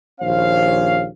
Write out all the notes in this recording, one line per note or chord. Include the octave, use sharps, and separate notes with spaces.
A#1 D#2 C#4 C5 F5